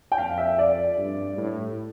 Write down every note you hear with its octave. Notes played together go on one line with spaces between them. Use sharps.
G5
F2 F5
E5
D5
G2
A2